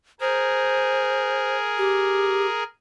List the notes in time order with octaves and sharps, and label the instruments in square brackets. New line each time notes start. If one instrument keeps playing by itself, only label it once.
[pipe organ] G#4 A#4 [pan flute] C5
[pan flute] G4